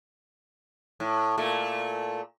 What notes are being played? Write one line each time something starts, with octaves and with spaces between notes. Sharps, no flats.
A2
A#2 A3